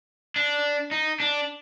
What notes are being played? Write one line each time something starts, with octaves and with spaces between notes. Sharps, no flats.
D4
D#4
D4